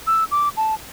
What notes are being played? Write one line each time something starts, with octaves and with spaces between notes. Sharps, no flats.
E6
D6
A5